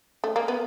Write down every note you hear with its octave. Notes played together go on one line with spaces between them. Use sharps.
A3
A#3
B3